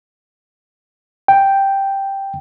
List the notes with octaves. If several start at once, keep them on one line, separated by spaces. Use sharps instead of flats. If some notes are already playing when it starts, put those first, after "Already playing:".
G5